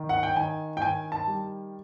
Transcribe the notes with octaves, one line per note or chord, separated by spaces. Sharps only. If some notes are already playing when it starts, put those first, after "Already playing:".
Already playing: D#3
F#5
G5
D#3 G#5
G5
D#3 G#5
A5
G3